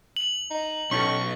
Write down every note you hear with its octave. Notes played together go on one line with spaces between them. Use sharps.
F#7
D#4
B1 C#4 G4 A4 C#6